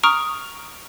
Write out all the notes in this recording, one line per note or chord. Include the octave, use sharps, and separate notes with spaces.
A#5 C#6 D#6 F6 D7